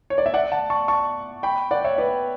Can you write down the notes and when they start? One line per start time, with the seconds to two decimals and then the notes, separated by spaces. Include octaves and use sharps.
0.10 C#5
0.18 D5
0.26 E5
0.34 D5 F#5
0.52 F#5 A5
0.70 A5 C#6
0.88 A5 C#6
1.43 G5 B5
1.71 D5 F#5
1.85 C#5 E5
1.98 B4 D5